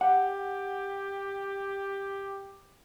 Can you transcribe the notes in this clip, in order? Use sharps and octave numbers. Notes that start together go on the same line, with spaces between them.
G4 F#5